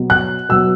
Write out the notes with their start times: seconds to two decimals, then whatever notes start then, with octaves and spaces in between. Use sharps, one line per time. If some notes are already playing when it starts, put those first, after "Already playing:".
Already playing: B2 F#3 B3
0.10 F#6
0.49 B2 F#3 B3 E6